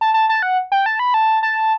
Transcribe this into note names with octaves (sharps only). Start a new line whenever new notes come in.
A5
A5
A5
F#5
G5
A5
B5
A5
A5